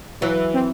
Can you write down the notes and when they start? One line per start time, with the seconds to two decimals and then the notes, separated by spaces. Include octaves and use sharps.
0.21 E3 F#3
0.54 C4